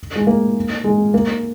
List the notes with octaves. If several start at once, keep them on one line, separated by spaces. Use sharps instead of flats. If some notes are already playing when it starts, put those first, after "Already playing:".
G#3
A#3
G#3
A#3